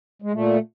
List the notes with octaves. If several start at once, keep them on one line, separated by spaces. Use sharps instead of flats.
G#3
A#2 A3